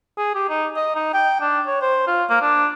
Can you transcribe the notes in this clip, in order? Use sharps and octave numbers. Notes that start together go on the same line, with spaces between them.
G#4
G4
D#4
D#5
D#4
G5
D4
C#5
C5
F4
A#3
D4